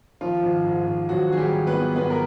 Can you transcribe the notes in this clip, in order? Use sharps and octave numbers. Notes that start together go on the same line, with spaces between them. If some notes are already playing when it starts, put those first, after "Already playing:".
D#3 F3 F4
G#1
G#2
G#1
G#1 F#3 F#4
D#3 G#4
G3 G4
G#1
B3 B4
D#3
G#2 B3 B4
A#4